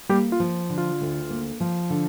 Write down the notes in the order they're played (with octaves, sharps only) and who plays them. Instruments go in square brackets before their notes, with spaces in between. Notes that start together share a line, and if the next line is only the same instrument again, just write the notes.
[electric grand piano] G3 G4 [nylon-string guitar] A#3
[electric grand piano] F4
[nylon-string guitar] F3
D3
[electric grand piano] F4
[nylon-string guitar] D2
A#3
F3
D3